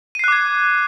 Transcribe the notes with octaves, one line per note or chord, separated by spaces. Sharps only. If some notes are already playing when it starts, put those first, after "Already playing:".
D6 F#6 G#6 C7 D#7